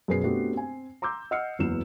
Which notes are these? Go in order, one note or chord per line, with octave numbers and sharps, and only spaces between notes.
F#2 B2 G#4 B4 C7
A3 B3 C4 D4 F#4 G4
C4 G#5
A#5 C6 D6 E6 G6
D#5 F#5 E6 F6 C7 C#7
F#1 E2 F#3 B3 E7